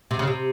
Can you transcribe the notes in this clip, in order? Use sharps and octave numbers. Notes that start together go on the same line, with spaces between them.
C3
C#3
C3